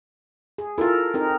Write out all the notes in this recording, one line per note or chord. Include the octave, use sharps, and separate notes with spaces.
G#4
E4 F4 A4 A#4
C4 D#4 A#4